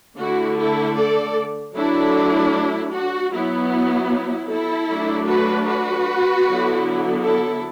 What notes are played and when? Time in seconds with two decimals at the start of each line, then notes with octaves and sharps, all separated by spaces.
0.19 D3 A3 E4 F#4
0.58 E4 A4
0.97 A4 D5
1.75 F#3 A3 D4 E4 A4
2.93 F#4
3.31 F#3 B3 E4
4.49 E4 A4
4.88 F#3 A3 D4
5.27 F#4 B4
5.67 F#4 B4
6.45 D3 F#3 B3 E4
7.23 E4 A4